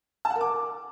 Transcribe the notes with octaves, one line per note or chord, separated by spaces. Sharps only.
A5
F#5
A#4
D6